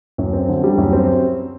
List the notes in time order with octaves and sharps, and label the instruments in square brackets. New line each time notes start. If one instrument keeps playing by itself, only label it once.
[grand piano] F#2
C4
D3
G3
F#2
C4